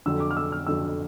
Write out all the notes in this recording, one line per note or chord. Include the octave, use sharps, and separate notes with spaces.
F2 D3 F#3 E6
D6
F6
E6
F6
F2 D3 F#3 E6